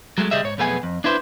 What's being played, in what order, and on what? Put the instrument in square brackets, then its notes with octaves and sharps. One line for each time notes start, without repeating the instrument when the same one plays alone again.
[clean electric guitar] F#3 G#3 A3
C#3 G3 G#4 D#5 E5
G#2 C#5
B1 F2 A3 B3 G#4 G#5
F2
D4 E4 B4 C5